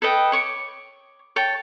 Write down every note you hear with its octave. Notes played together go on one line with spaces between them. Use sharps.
A4 B4 D#5 G5
C#5 C#6 D6
C#5 G5 A5